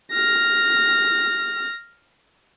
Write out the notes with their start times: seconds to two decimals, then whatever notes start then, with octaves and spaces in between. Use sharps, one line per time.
0.12 F6 A#6